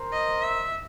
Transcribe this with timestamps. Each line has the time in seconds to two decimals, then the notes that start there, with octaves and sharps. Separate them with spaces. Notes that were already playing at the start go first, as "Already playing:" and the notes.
Already playing: A#4 C5
0.12 D#5
0.42 E5